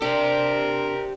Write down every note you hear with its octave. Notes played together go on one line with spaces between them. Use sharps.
D4 G4 A#4 C5